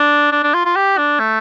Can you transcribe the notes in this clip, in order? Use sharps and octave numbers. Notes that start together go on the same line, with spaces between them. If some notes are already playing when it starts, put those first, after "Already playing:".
Already playing: D4
D4
D4
F4
F4
G4
D4
A3